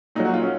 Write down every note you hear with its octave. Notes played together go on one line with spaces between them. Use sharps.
A#2 F#3 D#4
F#4
F4
C#4